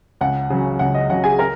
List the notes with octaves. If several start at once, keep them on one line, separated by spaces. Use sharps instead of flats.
C#2 F#5
C#3 F#3
C#2 F#5
D#5
C#3 F#3 F#5
G#4 G#5
A#4 A#5